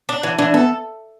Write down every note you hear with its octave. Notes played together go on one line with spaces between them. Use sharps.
D4
E3
E3 D4
B3 A4